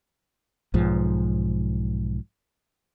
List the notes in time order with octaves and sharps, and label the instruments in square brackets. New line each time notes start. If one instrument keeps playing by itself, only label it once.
[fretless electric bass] B1 G#2 F3